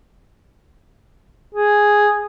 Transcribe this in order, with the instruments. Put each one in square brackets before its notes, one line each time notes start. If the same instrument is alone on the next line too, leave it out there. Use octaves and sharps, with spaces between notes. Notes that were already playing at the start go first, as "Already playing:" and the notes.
[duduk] G#4